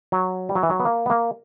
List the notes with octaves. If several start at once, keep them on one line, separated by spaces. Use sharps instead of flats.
F#3
G3
F#3
E3
F#3
B3
A#3
B3
A#3